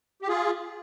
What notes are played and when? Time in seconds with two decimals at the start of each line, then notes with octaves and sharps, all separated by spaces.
0.22 G4
0.28 F4 G#4